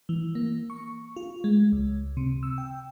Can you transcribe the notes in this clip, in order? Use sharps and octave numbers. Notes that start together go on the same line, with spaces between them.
E3
A#3
C#6
F4
G#3
C#2
C3
E6
G5